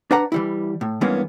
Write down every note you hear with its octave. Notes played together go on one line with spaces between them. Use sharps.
D4 B4 F#5 A#5
E3 G3 E4
A2
G2 E3 G#3 A#3 B3 C#4